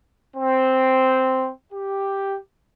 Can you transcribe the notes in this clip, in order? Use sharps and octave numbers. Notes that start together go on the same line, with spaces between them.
C4
G4